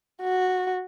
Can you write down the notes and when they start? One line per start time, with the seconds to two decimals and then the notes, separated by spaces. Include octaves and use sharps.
0.22 F#4